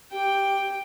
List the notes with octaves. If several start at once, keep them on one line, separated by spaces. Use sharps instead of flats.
G4 G5